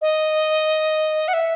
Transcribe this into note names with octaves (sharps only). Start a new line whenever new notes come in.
D#5
F#5
E5